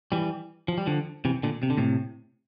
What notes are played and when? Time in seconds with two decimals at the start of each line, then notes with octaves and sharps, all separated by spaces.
0.12 E3 G3
0.68 F3
0.78 G3
0.87 D3 F3
1.25 C3 E3
1.43 A#2 D3
1.63 C3
1.70 D3
1.78 A2 C3